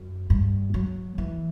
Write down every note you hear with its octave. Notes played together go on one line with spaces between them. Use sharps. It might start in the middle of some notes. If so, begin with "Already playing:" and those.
Already playing: F#2
G2
F#3
E3